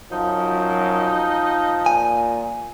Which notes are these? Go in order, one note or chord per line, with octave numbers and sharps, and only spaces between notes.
F#2 F3 D#4
A#2 G#5